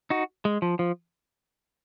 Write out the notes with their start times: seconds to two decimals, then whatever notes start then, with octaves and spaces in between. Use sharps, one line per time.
0.10 D#4 F#4
0.45 G#3
0.62 F3
0.79 F3